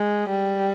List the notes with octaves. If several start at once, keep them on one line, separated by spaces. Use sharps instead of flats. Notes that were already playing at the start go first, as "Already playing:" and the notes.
Already playing: G#3
G3